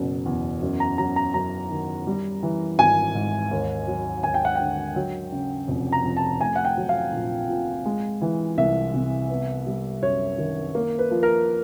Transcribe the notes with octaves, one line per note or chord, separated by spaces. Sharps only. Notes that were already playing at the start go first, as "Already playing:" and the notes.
Already playing: F#1 B2
E2
F#2
A#5
F#3 A#5
A#5
F#2 A#5
D#3
G3
E3
G#1 G#5
G#2
D#2
F#3
D#2 G#5
G5
F#5
D3 G5
F#3
C#3
F1
A#5
F2
A5
A3 G#5
F#5
G5
F#3
F5
A#1
A#2
G#3
E3
C2 E5
C3
B3
G3
F#2 C#5
D#3
A#3
B4
F3
A#4